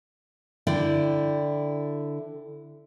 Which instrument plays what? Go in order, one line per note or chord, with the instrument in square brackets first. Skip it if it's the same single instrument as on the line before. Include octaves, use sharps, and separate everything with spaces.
[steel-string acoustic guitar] D3 E4 D5 G5